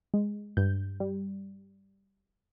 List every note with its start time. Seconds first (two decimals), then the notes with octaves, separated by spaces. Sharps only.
0.14 G#3
0.57 G2 G6
1.00 G3